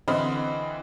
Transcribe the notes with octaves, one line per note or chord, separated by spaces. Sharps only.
D3 E3 C4 D#5 B5 F6